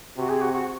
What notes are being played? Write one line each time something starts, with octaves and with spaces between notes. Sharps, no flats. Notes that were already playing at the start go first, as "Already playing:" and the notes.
C3 F#4
G#4
F#4
F#4